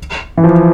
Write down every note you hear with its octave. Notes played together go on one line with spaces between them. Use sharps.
E3
F3